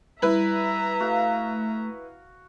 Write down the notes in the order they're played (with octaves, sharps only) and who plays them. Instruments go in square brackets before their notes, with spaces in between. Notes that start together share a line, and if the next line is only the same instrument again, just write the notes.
[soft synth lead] G3 [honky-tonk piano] E4 B4 [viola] E5 A#5
[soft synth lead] A3 [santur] F#4 F5